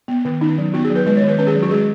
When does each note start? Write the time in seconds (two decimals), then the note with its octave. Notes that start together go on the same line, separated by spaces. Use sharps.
0.08 B3
0.25 D#3
0.41 C#4 D#4
0.58 F#3
0.74 B3 F#4
0.84 G#4
0.90 F#3
0.95 B4
1.06 G#3 B4
1.17 C#5
1.23 D#3
1.28 B4
1.39 C#4 B4
1.47 G#4
1.55 F#3
1.63 F#4
1.71 G#3 G#4